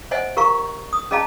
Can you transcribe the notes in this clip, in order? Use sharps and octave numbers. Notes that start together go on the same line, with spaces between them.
C5 C#5 D#5 E5 F#5 G#5
G4 A#4 F5 A#5 C#6
D#6
C#4 G#4 D#5 F5 A5 A#5